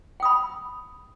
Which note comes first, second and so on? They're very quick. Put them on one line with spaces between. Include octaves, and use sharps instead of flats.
G5 D#6 B5